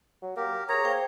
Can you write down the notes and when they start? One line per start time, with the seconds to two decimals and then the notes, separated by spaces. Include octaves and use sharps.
0.22 F#3
0.37 A#3 G4 A#4
0.69 G#4 A#4 C#5 A#5 D#6
0.84 A#3 C5 G5